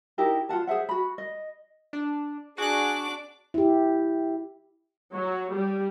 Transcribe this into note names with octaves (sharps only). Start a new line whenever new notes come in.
D#4 E4 G4 A#4
F4 G#4 F#5 A5
G#4 C5 E5 F#5
F#4 B5
D#5
D4
D4 F#4 G#4 D6 F#6
E4 G4
F#3
G3